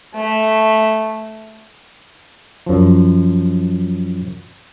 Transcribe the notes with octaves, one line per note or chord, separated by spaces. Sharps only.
A3
F#2 F3